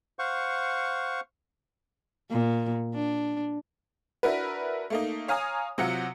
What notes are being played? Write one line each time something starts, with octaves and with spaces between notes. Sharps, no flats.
C5 F5 F#5 C#6
A#2
D4
D4 E4 F#4 A#4 B4
A3 A#3 D#4
C#5 F5 G#5 A#5 D#6
C3 F#3 F4 F#5 C#7